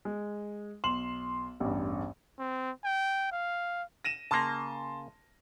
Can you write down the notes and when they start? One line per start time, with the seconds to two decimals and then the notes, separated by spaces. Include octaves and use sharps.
0.05 G#3
0.84 B1 C6 E7 F#7
1.60 A1 E2 G2
2.39 C4
2.84 G5
3.32 F5
4.04 A#6 D#7 E7
4.31 C#3 A#3 A5 C6 A#6